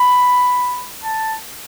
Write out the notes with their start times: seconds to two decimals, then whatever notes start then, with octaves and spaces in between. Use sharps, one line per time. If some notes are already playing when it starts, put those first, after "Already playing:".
Already playing: B5
1.03 A5